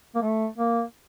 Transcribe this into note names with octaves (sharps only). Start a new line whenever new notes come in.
A#3
A3
A#3